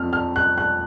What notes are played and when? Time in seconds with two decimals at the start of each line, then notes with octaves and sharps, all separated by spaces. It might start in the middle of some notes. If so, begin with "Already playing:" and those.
Already playing: F2 F3 F6
0.13 F6
0.36 F#6
0.58 F#6